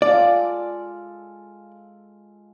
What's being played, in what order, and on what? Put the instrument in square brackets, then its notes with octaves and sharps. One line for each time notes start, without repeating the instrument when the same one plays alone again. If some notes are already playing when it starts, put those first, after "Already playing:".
[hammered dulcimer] G#3 F4 A4 [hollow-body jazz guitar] D5